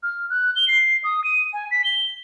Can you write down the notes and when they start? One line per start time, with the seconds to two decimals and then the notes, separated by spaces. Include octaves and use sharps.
0.03 F6
0.30 F#6
0.56 G7
0.68 C7
1.04 D#6
1.24 D#7
1.53 G#5
1.71 B6
1.84 G7